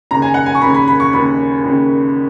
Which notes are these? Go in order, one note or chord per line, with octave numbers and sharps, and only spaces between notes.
D#2 C#3 A#5
G#5
F#5
G#5
C#6
D#2 C#3 B5
B5
B5
C#6
D#2 C#3 B5
D#2 C#3